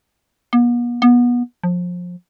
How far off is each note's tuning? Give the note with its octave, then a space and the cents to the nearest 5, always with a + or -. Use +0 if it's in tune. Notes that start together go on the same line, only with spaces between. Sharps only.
B3 -45
B3 -25
F3 +25